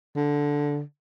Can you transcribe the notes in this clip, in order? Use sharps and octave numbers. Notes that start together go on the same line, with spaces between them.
D3